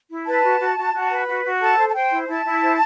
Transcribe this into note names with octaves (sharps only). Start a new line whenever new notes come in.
E4
B4 A5
F#4
F#4
F#4
F#4
B4
F#4
F#4
A4 A5
C5
A5
C5 G5
E4
E4 A5
E4
C5